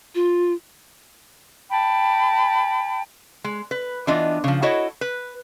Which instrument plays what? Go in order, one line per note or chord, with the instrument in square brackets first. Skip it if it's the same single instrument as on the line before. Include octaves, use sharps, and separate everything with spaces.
[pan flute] F4
[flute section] G5 A5 B5
[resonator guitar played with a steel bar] G#3
B4
E3 B3 D4 F4 D#5
C#3 F3
E4 F#4 A4 C#5 D#5
B4